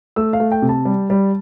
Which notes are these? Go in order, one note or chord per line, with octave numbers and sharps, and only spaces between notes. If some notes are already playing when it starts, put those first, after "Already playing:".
A3 E6
F5
A3
G5
C3
A5
G3
G3